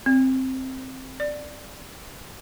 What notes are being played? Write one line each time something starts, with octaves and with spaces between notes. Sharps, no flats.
C4
D5